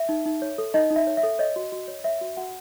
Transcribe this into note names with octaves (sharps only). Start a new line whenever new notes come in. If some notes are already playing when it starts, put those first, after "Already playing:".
Already playing: E5
D#4
D#4
C#5
A4
D#4 D#5
D#4
E5
C#5
E5
A4
C#5 D#5
F#4
F#4
C#5
C#5 E5
F#4
F#4 F#5